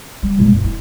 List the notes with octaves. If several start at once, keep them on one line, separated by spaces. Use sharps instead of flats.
G3
A#2 G#3
F#2
E4